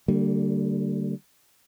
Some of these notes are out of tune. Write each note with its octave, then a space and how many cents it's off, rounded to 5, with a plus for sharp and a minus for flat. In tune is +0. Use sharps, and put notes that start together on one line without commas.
D3 +0 G3 -30 A#3 -45